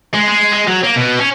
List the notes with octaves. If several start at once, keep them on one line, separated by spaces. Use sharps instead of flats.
G#3
G#3
G#3
F#3
A#3
B2
C#4